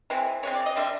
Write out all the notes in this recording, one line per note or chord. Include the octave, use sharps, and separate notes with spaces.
E3 G#3 C4
E3 G#3 C4 C#5
D5
D#5
D3 G3 C4 E5